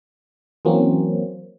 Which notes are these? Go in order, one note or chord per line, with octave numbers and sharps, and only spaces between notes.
E3 F#3 A#3 C4 C#4